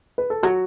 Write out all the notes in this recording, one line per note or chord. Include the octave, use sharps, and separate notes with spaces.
B4
A4
F#3 F#4